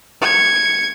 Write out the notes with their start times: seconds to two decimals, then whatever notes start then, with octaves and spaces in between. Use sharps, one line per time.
0.22 G#6 C#7